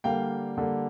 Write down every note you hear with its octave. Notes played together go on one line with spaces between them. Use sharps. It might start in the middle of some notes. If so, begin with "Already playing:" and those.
D3 G3 A#3 F5 G5
D3 G3 A#3